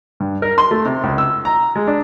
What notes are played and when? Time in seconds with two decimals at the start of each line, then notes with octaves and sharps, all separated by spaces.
0.20 G2
0.42 A#4
0.58 C6
0.71 A3
0.86 C3
1.04 C#2
1.18 E6
1.45 A#5
1.76 G#3
1.87 D4